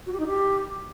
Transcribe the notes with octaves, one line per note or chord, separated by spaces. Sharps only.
F#4
G4
D#4
G4